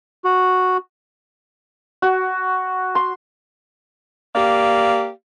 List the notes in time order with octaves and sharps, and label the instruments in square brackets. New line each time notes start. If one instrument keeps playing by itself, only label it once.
[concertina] F#4
[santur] F#4
C6
[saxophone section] A#3 G4 D5 F5